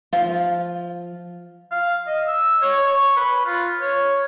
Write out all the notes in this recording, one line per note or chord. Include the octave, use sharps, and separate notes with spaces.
F3 F4
F5
D#5
E6
C#5
C#6
B4
F4
C#5